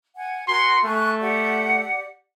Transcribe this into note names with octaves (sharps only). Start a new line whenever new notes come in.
F#5 G#5
F#4 A#4 G#5 C6
A3 G#5 C#6 F#6
G4 D5 F#5